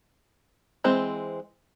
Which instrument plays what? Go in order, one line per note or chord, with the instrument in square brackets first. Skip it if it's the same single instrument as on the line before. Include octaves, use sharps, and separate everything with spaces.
[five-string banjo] E3 G#3 C4